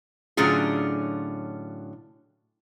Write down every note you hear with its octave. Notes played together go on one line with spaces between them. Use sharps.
A2 D3 F#3 C#4 F4 G#4